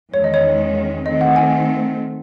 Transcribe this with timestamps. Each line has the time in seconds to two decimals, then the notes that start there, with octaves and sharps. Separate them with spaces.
0.13 E2 D#3 G#3 C#4 C#5
0.24 D#5
0.34 C#5
1.05 D#3 A3 C4 D#5
1.21 F#5
1.36 G#5